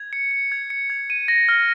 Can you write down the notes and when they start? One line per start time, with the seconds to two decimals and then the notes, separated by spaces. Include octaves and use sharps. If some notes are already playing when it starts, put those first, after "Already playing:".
Already playing: G#6
0.13 C#7
0.31 C#7
0.52 G#6
0.70 C#7
0.90 G#6
1.10 D#7
1.28 A#6
1.49 F6